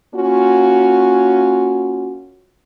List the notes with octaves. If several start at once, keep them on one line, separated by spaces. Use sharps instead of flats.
A#3 C#4 F4 F#4